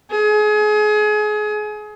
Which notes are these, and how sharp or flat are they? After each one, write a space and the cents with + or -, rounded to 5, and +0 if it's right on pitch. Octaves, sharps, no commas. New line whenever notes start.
G#4 +30